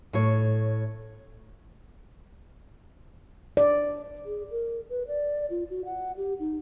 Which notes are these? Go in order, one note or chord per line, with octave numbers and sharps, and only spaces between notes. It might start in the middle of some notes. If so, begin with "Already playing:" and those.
A2 C#5
D5
G#4
A#4
B4
D5
F4
F#4
F#5
G4
D#4